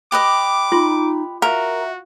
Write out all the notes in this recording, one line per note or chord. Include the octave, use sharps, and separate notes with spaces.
G4 B4 D#5 D6
D#4 F4 C6
F#4 A#4 E5 F5